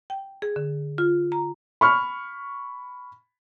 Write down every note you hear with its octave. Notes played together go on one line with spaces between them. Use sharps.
G5
G#4
D3
F4
A#5
B5 C#6 F6